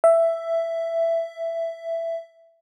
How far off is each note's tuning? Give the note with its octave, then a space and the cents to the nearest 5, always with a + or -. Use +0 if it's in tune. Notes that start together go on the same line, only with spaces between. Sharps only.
E5 +10